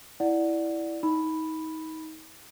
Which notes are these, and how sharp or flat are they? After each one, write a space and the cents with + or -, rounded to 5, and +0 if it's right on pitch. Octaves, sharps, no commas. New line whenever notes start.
E4 +0 D5 +0 F#5 +0
D#4 +30 B5 +0